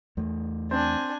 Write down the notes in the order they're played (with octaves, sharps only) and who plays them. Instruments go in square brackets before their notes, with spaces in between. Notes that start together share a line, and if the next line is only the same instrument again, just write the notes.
[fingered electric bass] E2 A3
[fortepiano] C4 [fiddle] D4 G#5